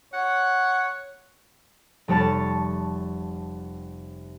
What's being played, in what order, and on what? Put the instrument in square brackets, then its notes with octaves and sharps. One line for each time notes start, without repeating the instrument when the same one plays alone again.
[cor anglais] C#5 [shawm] F#5
[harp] F1 G3 C#5 A5 A6